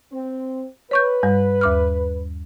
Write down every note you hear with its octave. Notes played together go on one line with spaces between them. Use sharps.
C4
B4 C#5 C#6 G6
G2 G3
D#2 D6 F6